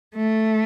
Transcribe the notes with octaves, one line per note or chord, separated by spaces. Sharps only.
A3